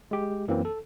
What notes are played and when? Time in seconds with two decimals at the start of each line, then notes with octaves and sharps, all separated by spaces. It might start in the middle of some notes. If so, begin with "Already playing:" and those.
0.11 G#3 G4
0.48 F#2 E3 F#3 A#3 C4
0.65 A4